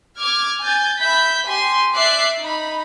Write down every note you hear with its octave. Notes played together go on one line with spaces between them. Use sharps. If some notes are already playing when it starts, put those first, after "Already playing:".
D6 F6 G#6
G#5 G6 A6
E5 B5 G6 B6
G4 G#5 C6
D5 E5 D6 F#6 C7
D#4 B5